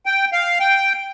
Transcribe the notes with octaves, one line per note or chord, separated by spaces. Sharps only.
G5
F5
G5